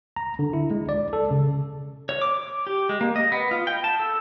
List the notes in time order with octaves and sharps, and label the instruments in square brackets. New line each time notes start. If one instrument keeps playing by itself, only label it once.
[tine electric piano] A#5
D3
E4
G#3
D5
A4
C#3
[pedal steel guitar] C#5
D6
D6
G4
G#3
A#3
D#5
B3
F4
G5
A5
A4